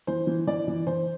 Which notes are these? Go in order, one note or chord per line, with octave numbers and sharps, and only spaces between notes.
E3 C5
E3
E3 D5
E3
E3 C5